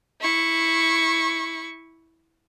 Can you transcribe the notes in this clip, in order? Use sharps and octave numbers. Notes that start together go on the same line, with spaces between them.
E4 C#6